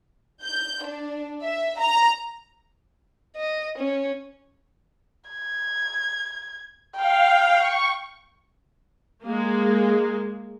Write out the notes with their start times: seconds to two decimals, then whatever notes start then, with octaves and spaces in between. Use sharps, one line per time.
0.43 G6
0.84 D4
1.43 E5
1.80 A#5
3.36 D#5
3.78 C#4
5.30 G#6
6.96 F5 G5
7.58 C#6
9.23 G#3 A#3